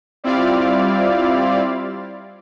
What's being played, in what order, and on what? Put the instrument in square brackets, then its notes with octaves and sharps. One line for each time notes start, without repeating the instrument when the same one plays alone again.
[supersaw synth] G3 C4 E4 F4 D5 F5